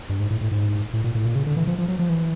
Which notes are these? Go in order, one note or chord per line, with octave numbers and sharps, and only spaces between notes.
G2
G#2
A2
A2
G#2
A2
A#2
A2
A#2
C#3
D3
E3
F3
F3
F#3
F3
E3